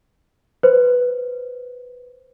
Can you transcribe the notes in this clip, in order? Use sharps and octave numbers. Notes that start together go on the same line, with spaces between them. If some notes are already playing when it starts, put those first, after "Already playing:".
B4 C5